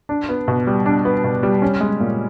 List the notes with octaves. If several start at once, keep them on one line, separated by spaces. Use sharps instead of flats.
D4
B3
B2
G3
D4
B3
B2
G3
C#4
G#3
A#2